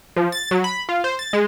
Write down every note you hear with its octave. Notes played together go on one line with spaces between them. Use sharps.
F3
A6
F#3
B5
F4
C5
A6
G#3